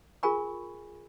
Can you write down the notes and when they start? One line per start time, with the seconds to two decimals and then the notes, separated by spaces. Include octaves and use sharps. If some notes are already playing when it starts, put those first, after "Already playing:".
0.23 F4 G#4 A#4 G#5 B5 C#6